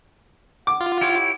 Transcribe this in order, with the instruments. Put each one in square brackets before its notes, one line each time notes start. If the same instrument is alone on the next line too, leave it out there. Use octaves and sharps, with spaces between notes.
[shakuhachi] F#5 [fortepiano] D6
[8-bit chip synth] F4
[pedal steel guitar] E4 G4 C#5